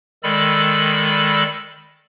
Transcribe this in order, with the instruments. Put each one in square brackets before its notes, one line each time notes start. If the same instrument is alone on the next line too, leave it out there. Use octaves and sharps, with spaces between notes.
[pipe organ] D#3 G#3 A4 D5 B5 E6